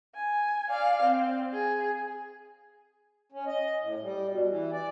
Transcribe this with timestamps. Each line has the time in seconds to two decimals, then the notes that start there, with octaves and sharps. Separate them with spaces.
0.15 G#5
0.70 D5 F5
1.03 C4
1.53 G#4
3.32 C#4
3.47 D#5
3.82 A2
4.02 G3
4.28 B2
4.47 E3
4.73 D5